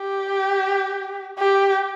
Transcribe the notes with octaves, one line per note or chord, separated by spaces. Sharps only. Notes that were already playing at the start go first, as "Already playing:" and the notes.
Already playing: G4
G4